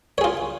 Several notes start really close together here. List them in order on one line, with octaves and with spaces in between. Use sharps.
C#5 G#4 F4